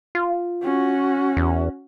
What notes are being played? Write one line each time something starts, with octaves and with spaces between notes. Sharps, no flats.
F4
C#4 F#4
E2